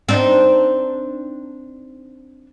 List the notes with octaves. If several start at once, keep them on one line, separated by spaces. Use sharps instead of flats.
C4 D4 D#4